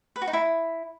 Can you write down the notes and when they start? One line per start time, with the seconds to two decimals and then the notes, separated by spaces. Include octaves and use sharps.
0.16 B4
0.22 F#4
0.27 D#4
0.33 E4